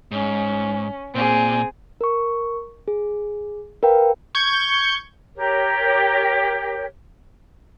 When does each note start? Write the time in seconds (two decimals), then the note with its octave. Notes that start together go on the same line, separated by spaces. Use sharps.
0.11 G#2 C#4
1.15 A#2 C4 G#4
2.01 A#4 C#6
2.88 G#4
3.83 A#4 B4 F5 G5
4.35 C#6 G6 G#6
5.36 G4 A#4 C#5